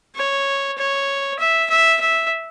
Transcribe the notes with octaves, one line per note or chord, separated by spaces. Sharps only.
C#5
C#5
E5
E5
E5